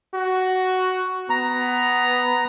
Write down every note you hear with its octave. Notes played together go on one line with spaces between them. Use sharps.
F#4
B3 A#5